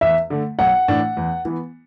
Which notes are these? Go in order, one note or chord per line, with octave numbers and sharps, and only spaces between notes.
E2 E5
D3 A3
B1 F#5
A2 E3 D4
E2
E3 B3